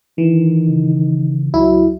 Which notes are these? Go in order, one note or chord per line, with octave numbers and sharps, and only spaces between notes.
D#3 E3
C#3
C#2 F#3 E4